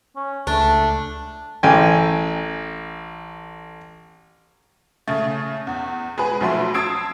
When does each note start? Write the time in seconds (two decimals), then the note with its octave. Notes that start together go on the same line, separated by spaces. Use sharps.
0.16 C#4
0.47 C#2 A3 D4
1.63 A1 G5 G#5
5.08 C#3 A3
5.67 E2
6.18 G#3 G#4 B4
6.41 B1 F3 F#3 A3 B4 C6
6.74 A5 D#6 E6 G#6 C7 D7